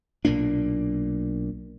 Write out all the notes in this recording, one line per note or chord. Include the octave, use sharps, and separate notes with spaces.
B1 A#2 A#3 D4